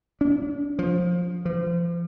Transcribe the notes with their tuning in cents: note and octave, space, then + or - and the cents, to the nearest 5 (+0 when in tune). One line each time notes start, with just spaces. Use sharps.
D4 -40
F3 +15
F3 -35